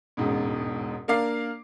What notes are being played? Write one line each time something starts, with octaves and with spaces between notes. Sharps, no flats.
E1 A1 G#2 B2
A#3 D4 A#4 F5 D6 C7